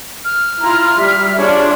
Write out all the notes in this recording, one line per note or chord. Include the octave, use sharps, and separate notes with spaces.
F6
E4 F4 A#5
G3 E5
D4 F4 G#4 C#5